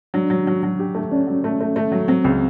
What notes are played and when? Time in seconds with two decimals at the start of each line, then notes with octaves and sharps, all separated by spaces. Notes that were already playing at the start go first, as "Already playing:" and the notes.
0.14 F#3 D4
0.30 F#3
0.47 F#3
0.63 F#3
0.79 G4
0.95 A3
1.11 C#4 D4
1.27 F#3
1.44 A3
1.61 A3
1.76 A3
1.92 F#3
2.08 F#3 C4
2.24 C#2